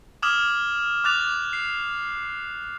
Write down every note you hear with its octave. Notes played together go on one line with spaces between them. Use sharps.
D6 D#6 F6 G#6 E7 F#7
D6 F#6 A6 F7
C7